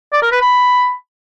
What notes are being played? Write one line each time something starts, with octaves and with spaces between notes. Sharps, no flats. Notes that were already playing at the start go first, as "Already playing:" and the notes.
D5
A#4
B4
B5